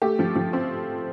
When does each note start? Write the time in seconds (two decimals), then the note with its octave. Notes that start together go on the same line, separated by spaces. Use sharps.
0.02 A3 G4
0.19 F3
0.35 F3
0.53 C4